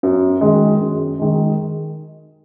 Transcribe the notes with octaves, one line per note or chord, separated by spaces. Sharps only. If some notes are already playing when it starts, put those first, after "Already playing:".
F#2
D#3 G#3
F#2
D#3 G#3